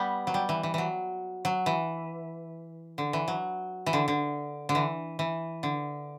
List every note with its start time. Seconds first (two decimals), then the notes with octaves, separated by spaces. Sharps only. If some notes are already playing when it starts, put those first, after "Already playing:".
Already playing: G3 B3
0.27 F#3
0.34 G3
0.49 E3
0.63 E3
0.74 E3 F#3
1.45 F#3
1.66 E3
2.98 D3
3.13 E3
3.28 F#3
3.86 E3
3.93 D3
4.08 D3
4.69 D3
4.75 E3
5.19 E3
5.63 D3